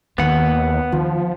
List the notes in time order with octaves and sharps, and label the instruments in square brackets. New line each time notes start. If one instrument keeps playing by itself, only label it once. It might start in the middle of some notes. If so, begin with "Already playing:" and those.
[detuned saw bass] D#2 [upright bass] D#3 A#3 [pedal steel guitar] B3 F#5
[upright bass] D#3 [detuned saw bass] F3